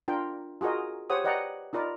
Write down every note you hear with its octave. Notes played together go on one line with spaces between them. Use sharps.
D4 F4 A#4 G5
F4 F#4 G#4 A#4 D#5
G4 C5 C#5 F#5 D#6
B4 D5 D#5 F#5 G5 A#5
D#4 F4 A#4 D5 B5